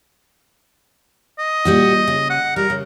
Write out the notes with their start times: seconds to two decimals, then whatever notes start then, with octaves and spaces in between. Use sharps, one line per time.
1.38 D#5
1.65 A#2 G3 F#4
2.07 C#3
2.30 F#5
2.56 G3 A#4
2.70 C#3